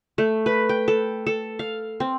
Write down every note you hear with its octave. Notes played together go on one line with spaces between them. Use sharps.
A3
B4
G5
A4
A4
F5
C4